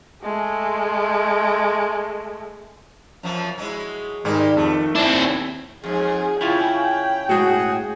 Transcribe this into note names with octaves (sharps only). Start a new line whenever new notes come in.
G#3 A3
F#2 F3 F#3
F#3 G#3 E4
G#2 D#3 G3 G4 G#4 A#4
F2 A3
D#2 C4 D4 E4
F2 G#2 G#4
C#3 E4 F4 G#4 G5
A2 G#3 F#4 G#4